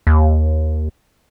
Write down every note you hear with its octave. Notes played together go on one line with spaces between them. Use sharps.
D#2